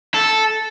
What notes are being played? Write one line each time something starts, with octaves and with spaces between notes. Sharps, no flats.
A4